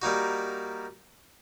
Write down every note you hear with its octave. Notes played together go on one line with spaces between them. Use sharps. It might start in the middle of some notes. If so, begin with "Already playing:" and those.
G3 A#3 D#4 F#4